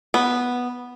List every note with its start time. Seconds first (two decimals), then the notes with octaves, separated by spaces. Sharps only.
0.14 B3